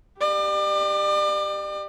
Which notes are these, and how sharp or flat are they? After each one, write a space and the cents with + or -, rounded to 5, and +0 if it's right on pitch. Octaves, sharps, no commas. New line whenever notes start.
G4 +0 D5 +35